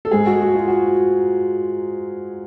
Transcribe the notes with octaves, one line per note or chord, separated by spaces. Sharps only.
A4
G#2 G#3 G#4
F#4
F#4
F4
F#4